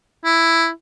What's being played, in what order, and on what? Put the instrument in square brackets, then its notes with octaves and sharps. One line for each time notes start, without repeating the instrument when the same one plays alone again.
[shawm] E4